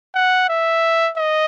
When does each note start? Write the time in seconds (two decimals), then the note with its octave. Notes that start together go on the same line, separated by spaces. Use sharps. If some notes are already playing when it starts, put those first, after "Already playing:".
0.15 F#5
0.49 E5
1.17 D#5